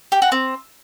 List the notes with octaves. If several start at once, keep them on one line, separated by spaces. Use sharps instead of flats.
G4
F#4
C4